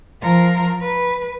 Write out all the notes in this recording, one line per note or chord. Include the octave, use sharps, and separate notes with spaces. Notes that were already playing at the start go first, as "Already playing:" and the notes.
F3 A#4
B4